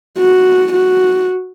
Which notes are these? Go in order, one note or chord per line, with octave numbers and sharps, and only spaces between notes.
F#4
F#4